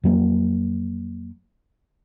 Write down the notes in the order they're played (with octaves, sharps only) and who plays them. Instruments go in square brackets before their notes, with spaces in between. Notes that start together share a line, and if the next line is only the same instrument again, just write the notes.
[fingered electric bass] F2 F#3 A#3